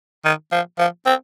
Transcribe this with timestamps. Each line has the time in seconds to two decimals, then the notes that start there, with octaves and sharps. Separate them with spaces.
0.25 D#3
0.52 F3
0.79 F3
1.06 C4